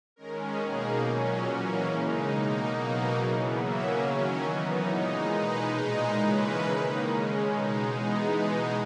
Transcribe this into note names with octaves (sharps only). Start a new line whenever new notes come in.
D#3 G#3 C#4 A#4
B2 A#3 D#4 G#4
A#2 F#3 C#4
E3 A#3 C#4 F#4
C#3 G#3 D#4
B2 A#3 D#4
B2 F#3 A#3 D#4 F#4
C#3 E3 B3 G#4
C#3 F#3 A#3 C#4 E5
D#3 F#3 C#4
E3 B3 D#4 D#5
A#2 G#3 D#4 C#5
B2 G#3 D#4 B4
A#2 G#3 D#4
C#3 E3 G#3 C#4 B4
D#3 A#3 D#4
C#3 G#3 C#4
B2 G#3 D#4
E3 G#3 B3 D#4 G#4
B2 G#3 D#4 B4